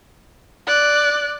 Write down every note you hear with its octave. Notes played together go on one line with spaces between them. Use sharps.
D5 F#6